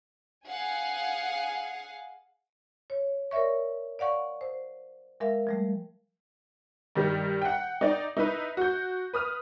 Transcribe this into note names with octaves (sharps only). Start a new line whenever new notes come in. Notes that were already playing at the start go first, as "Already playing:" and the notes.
G#4 F5 F#5 G#5
C#5
A#4 C#5 D5 E5 C#6
D5 F5 F#5 C#6
C5
G#3 A#4 E5 F5
F3 G3 A3
G2 D#3 G3
F#5 G5
D#4 D5
D#4 E4 B4
F#4 G6
B4 D#6 F6